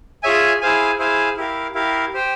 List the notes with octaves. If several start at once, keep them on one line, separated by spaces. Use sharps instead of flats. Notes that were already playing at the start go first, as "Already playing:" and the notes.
F4 G#4 C#5 E5 G#5
E4 G#4 C5 F5 G#5
E4 G#4 C5 F5 G#5
E4 G4 A#4 F5
E4 G4 A#4 F5
G4 C5 G5